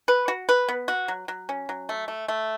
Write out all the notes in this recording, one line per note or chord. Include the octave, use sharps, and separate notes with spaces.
B4
F#4
B4
B3
F#4
F#3
F#3
C#4
F#3
A3
A3
A3